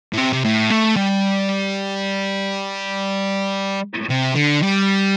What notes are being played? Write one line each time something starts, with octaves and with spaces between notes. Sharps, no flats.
A2
C3
C3
A2
A3
G3
C3
D3
G3